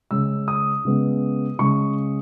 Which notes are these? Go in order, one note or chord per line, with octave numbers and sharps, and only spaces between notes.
C#3 G#3 C#4 E6
D#6
C#3 G#3 B3
C#3 G#3 C#6